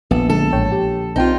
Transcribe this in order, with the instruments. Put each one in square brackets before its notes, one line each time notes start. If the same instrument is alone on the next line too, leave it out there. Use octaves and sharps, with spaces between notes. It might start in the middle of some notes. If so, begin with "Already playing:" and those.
[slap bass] A#1 [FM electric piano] B3 [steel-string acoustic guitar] A4
[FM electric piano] D3 G#3 [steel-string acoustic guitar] A4
[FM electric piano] A1 C#5 G5
G4
[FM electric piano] B1 C4 G5 [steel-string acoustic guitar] D#4 F4